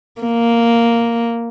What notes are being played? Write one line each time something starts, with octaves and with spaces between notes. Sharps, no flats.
A#3